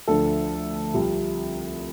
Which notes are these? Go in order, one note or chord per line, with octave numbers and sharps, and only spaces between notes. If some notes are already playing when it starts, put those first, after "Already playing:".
D2 D3 F3 A4
C2 C3 F3